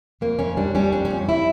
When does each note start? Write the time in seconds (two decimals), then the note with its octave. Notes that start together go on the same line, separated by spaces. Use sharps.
0.21 F2 A#3
0.39 F2 C#4
0.57 G3 D4
0.75 G3 C#4
0.92 F2 D4
1.05 C#4
1.11 F2
1.29 E4